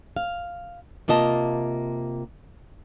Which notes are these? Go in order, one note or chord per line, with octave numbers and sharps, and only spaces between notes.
F5
C3 A#3 F4 D#5 A5